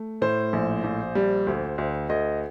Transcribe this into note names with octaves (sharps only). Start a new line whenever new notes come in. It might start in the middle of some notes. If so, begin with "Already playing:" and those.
Already playing: A3
A2 C5
A#1
A#1
G3
D2
D2
D2 D#5